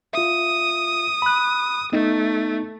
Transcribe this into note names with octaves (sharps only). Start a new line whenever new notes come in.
F4 E5 D#6
B5 F#6
A3 B3 D#4